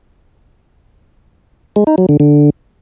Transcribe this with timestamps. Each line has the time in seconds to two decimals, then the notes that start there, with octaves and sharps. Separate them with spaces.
1.76 G#3
1.87 D#4
1.98 F#3
2.09 D3
2.20 D3